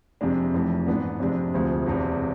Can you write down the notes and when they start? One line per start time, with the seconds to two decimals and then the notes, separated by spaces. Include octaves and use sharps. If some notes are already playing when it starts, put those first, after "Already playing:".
0.21 F2 C3 G#3 D4
0.54 F1 F2 E3
0.86 G#2 E3 G#3 B3 D4
1.20 F2 C3 G#3 D4
1.54 D2 C3 F3 G#3
1.86 E1 E2 C3